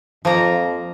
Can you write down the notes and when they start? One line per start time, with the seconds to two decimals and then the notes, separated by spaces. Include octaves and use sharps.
0.25 F2 F3 A#3 A#5